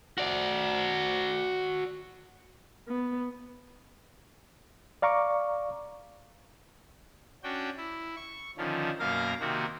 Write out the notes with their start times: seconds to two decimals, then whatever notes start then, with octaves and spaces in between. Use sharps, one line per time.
0.18 F#4 D5
2.88 B3
5.02 D5 F5 A#5 C#6 D6
7.44 C#4 D4 F#4 G5
7.77 E4
8.16 C#6
8.58 D3 D#3 F3 C#4
8.99 F#2 B2 A#3 A#4 F5 A#6
9.40 C3 D#3 A#3 C4 F#4